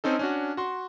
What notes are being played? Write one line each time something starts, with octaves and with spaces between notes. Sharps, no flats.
C4 C#4 D#4 A4
C#4 D4 F#4
F#4 C6